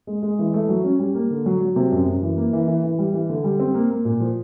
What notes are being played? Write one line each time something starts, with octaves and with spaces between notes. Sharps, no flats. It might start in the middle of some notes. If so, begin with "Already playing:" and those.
G#3
G#3
E3
A3
F#3
C#4
G3
A#3
D3
F#3
F#3
C3
F#2
F#2
E3
A#3
E3
E3
E3
G3
E3
D3
G3
C4
A#3
A#3
A#2
F3